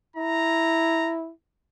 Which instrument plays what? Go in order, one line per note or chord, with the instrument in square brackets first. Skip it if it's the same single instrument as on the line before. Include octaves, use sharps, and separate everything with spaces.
[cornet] E4 [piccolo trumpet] A#5